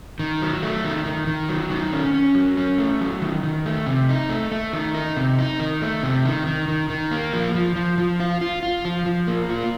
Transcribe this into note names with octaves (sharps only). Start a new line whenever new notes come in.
D#3
F#3
A3
D#3
D#3
D#3
F#3
D#3
C#4
C#4
F#3
C#4
A3
F#3
D#3
D#3
A3
C3
D#4
A3
A3
D#3
D#4
C3
D#4
D#3
A3
C3
D#3
D#3
D#3
D#3
A#3
F3
F3
F3
F3
F4
F4
F4
F3
F3
A#3
F4